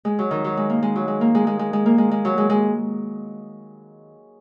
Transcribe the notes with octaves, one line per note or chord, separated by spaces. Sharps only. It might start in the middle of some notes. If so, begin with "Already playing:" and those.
G#3
F#3
D#3
F#3
G#3
A#3
G#3
F#3
G#3
A#3
G#3
G#3
G#3
G#3
A#3
G#3
G#3
F#3
G#3
G#3